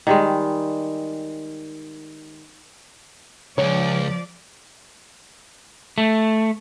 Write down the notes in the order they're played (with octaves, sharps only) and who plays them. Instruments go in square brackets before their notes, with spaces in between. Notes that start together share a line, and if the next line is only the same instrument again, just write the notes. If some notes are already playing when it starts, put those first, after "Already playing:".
[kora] D#3 G3 G#3
[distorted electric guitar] C#2 [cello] F3 D5 [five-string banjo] C#5
[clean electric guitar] A3